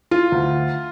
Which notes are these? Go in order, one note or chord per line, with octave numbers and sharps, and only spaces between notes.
F4
D2